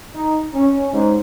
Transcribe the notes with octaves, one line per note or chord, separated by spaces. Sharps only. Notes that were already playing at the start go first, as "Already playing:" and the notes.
D#4
C#4
G#2